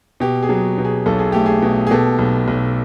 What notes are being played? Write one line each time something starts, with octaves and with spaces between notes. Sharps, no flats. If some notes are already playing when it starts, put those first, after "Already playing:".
B2 G4
G#4
F#3
B2
G#4
B1 A4
G#4
A3 G4
G#4
B2
G#4
B2 G4 A4
B1
B1